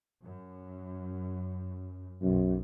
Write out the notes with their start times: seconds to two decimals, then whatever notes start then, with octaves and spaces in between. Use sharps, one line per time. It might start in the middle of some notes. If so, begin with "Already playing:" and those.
0.23 F#2
2.22 B1 F#2